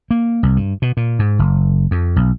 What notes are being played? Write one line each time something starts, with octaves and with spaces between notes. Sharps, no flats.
A#3
C2
G2
B2
A#2
G#2
F#1
F2
B1